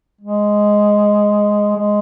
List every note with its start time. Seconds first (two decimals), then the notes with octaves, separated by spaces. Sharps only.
0.21 G#3
1.77 G#3